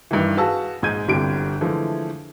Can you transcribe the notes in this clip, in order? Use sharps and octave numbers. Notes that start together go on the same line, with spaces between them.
G2 D#3 E3
F#4 G#4 B4 F5 A5 E6
A#1 G#2 G#3 G6 G#6 D#7
G1 C2 D3 G3 D7
D3 E3 F3 G#3 A3